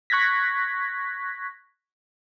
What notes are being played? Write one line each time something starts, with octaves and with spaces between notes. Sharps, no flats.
C#6 F#6 G#6 A#6 B6